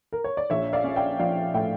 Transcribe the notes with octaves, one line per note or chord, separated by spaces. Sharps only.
A#4
C#5
D5
A#1 C#5 E5
D5 F5
C#4
E5 G5
F3 D5 F5
A2 E5 G5